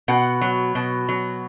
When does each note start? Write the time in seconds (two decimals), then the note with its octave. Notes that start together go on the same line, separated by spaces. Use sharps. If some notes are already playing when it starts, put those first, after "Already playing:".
0.08 B2 F#5
0.41 F#3
0.75 B2
1.09 F#3